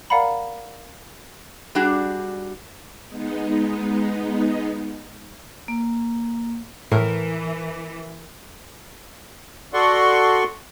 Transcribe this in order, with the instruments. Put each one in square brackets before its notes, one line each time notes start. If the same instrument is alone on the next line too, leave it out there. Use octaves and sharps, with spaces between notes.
[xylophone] A#4 D5 F5 F#5 A#5 B5
[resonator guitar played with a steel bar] G3 D4 F#4 G#4
[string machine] G#3 B3 D#4
[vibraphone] A#3
[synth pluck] A2 [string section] E3 [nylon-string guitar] A#4
[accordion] F#4 A4 D5 F#5 C6 C#6